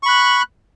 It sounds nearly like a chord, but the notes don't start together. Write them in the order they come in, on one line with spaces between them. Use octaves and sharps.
C#6 B5 F#6